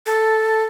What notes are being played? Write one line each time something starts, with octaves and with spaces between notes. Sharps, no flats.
A4